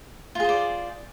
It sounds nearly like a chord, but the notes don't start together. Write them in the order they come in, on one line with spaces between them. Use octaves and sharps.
F4 G#4 C5 D5